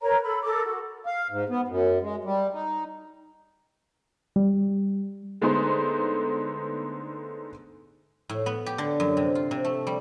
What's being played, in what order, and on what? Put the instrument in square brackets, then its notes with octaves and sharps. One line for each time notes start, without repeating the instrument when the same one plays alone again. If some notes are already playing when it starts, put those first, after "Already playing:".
[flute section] A#4 B4 C#5 A#5
A4 B5
A4 A#4 D6
F#4 A4
[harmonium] F5
G#2
B3
F#2
G#3
G3
D#4
[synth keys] G3
[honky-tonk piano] D3 G#3 A3 B3 D#4 C5
[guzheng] A2
B3
G4
D3
F#2
C3
F4
C3
A3
G3